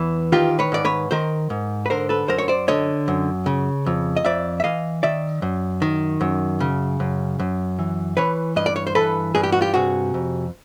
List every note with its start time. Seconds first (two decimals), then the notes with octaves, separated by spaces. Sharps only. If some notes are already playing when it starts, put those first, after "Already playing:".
Already playing: E2 E3
0.32 D#3 F4 G4
0.59 B4 C#5
0.72 G#2 D5
0.85 B4 C#5
1.11 D#3 A#4 C5
1.50 G#2
1.86 B4
1.90 D3 A#4 C5
2.09 A4 B4
2.28 F#2 A#4 C5
2.38 C#5
2.48 C5 D5
2.68 D3 C#5 D#5
3.08 F#2
3.46 C#3
3.86 F2
4.17 D#5
4.25 F2 D5 E5
4.60 E5
4.64 E3 D#5 F5
5.03 D#3 D5 E5
5.42 F#2
5.82 D#3
6.21 F#2
6.60 C#3
7.00 F#2
7.39 F#2
7.79 E3
8.17 E3 B4 C#5
8.56 G2 D#5
8.66 D5
8.76 C#5
8.87 C5
8.95 E3 A4 B4
9.35 G2 G#4
9.43 G4
9.52 F#4
9.61 F4 G4
9.74 C3 F#4 G#4
10.14 F2